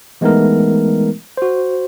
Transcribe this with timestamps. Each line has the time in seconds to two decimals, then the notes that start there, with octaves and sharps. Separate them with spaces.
0.21 E3 G#3 A3 B3 D#4 A#4
1.37 F#4 C5